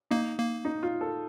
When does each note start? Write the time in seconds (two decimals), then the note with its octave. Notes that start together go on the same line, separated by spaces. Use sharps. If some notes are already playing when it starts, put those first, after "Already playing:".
0.11 A#3 D#4
0.38 A#3
0.65 D#4
0.83 F4
1.01 A4